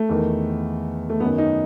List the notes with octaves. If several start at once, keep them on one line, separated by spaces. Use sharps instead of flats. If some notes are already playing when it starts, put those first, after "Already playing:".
Already playing: A3
E2 D#3
A3
F#2 D#3 B3
D#4